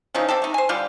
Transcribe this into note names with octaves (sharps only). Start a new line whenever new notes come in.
C#3 E3 F3 D#4
C4 G4 A4
A3 D#4
C5 G#5
D3 G3 F4 G4